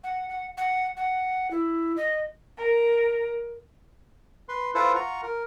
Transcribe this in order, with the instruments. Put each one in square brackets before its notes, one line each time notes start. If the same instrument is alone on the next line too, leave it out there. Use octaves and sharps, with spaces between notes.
[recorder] F#5
F#5
F#5
F#5
E4
D#5
[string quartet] A#4
[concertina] B4 C6
E4 F4 A4 B4 C5
F4 F#5 A#5 C#6
A#4